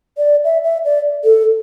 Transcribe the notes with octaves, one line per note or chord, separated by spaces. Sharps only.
D5
E5
E5
D5
A4